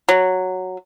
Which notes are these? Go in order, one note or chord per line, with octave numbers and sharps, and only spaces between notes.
F#3